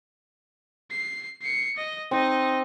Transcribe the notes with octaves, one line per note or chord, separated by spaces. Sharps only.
C7
C7 C#7
D#5
C4 D#4 D#5